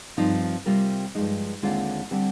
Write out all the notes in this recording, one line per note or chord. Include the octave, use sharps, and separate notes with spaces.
G2 F3 C4 D#4
C3 G3 C4 F4 A#4
G2 F3 G#3 D#4
D#2 D3 G#3 C4 F4
D3 G3 C4 G4